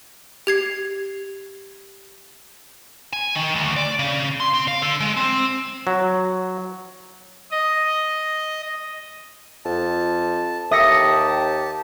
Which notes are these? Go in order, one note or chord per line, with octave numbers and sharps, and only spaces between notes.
G4 G#6 C7
G#5
D#3
D2
D5
C#3
C6
C4
F5
D3
G#3
C4
F#3
D#5
F2 A5
D#2 G4 E5 A5 D#6 A#6 C#7